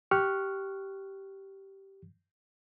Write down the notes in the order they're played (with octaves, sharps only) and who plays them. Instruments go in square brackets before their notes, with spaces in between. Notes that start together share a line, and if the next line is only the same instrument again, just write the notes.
[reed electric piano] G4 C#6 F6 F#6